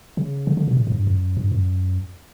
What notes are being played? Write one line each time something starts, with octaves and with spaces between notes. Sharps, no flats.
C#3
D3
D3
B2
A2
A2
G2
F#2
G2
F#2